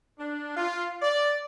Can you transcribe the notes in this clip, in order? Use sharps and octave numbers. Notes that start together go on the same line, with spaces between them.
D4
F4
D5